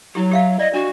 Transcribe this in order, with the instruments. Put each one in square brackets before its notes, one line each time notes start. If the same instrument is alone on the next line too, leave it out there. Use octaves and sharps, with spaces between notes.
[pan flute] F#3 [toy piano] E4 G4
[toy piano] G4 E5 F5
[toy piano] D5 [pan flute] D#5
[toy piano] D4 [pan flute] F#4